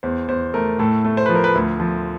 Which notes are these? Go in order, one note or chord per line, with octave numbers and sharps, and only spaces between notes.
E2 C5
E2 C5
A3 A#4
A2 A4
A3
C5
F3 B4
A#4
B4
D2
F3